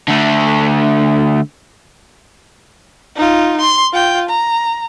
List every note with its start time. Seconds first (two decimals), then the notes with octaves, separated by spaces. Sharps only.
0.08 D3 A3
3.16 D#4 F4
3.60 C6
3.93 F4 G5
4.29 A#5